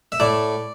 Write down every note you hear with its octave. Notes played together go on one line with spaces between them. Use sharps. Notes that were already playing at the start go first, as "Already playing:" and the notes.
E5
A2 D5